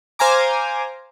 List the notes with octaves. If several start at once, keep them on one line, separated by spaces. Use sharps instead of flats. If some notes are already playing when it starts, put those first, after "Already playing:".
C5 F5 G#5 A#5 D6